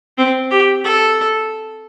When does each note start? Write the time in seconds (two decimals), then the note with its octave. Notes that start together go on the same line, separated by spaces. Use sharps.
0.18 C4
0.51 G4
0.84 A4